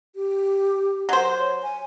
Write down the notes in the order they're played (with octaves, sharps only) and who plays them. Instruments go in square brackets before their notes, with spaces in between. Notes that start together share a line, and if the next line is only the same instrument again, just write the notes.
[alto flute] G4
[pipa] F#3 C5
[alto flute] C#5
G#5